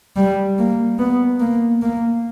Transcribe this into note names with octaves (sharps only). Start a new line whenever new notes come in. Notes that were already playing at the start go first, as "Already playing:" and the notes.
G3
A#3
B3
A#3
A#3